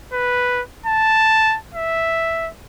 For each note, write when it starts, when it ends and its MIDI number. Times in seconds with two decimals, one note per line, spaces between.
0.13 0.61 71
0.86 1.57 81
1.74 2.49 76